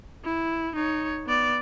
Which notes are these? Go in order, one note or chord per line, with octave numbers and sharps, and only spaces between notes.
E4
D#4 C#5
B3 D5